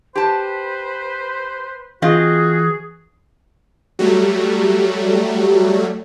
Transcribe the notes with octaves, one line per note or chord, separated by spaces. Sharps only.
G4 B4 C5 A5
E3 C4 F4 F#4 G#4 D#5
F#3 G3 A3